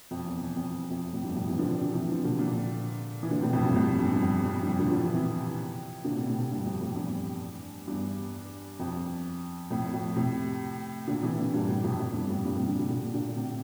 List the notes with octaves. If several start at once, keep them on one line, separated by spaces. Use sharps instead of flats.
F2
E2
E2
F2
E2
E2
F2
F2 A2
E2 G2
F2 A2
C3 E3
D3 F3
D3 F3
D3 F3
C3 E3
D3 F3
A#2 D3
A#2 D3
E3
A#2 D3
A2 C3
F2 A2
G2 A#2
F2 A2
E2 G2
G2
F2
F2
G2
F2
A#2 D3
D3 F3
C3 E3
C3 E3
A#2 D3
A2 C3
A2 C3
A2 C3
G2 A#2
F2
F2 A2
E2 G2
E2 G2
F2
F2 A2
F2 A2
A2 C3
A#2 D3
C3 E3
A#2 D3
G2 A#2
A2 C3
F2 A2
F2
E2 G2
F2 A2
G2 A#2
A2 C3
A#2 D3
A#2 D3
A#2 D3
A#2 D3
A2 C3